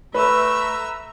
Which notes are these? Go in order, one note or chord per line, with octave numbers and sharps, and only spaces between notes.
A3 B4 E5 A#5 E6